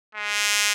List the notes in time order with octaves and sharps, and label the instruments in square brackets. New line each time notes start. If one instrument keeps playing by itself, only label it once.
[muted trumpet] G#3